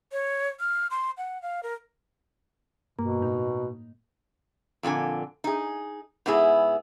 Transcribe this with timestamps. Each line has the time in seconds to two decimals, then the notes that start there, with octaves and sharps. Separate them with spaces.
0.12 C#5
0.60 F6
0.91 C6
1.18 F#5
1.42 F5
1.63 A#4
2.99 G2 B2 A#3
3.21 A2 D#4
4.83 F2 A#2 D3 G#5
5.44 D#4 G#4
6.26 G#2 B3 E4 G#4